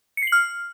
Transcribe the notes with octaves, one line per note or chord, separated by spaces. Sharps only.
C#7
C7
F#7
F6